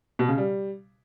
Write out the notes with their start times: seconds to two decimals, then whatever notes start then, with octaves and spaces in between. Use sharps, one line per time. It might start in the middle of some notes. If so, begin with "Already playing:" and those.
0.19 B2
0.29 C#3
0.38 G3